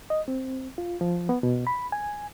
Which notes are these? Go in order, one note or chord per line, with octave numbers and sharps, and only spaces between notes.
D#5
C4
F4
F3
B3
B2
B5
G#5